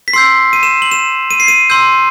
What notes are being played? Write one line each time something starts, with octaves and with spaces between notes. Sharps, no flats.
B6
C6 E6 G6 C7
D#7
E7
F#7
E7
D#7
C7
D#7
C6 E6 G6